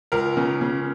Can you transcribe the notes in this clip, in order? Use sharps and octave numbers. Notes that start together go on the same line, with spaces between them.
C#2 A#4
C#3
C#3